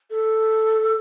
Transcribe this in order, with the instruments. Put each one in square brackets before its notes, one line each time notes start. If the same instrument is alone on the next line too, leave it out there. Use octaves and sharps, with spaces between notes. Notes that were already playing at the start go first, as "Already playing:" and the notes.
[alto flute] A4